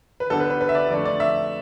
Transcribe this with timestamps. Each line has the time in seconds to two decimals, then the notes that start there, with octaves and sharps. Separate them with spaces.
0.20 B4
0.30 D3 G3 B3 D4 A4
0.40 B4
0.50 B4
0.61 B4
0.69 E5
0.75 D5
0.90 F2 D3 A3 D5
1.06 D5
1.20 E5